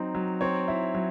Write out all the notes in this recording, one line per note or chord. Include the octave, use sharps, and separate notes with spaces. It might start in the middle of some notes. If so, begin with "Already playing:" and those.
Already playing: F#3 C4 D#4
F#3
C4 C#5
E4
F#3